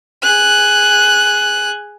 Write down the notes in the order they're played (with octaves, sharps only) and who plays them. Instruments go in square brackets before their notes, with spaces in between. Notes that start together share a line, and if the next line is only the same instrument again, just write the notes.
[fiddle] G#4 F#6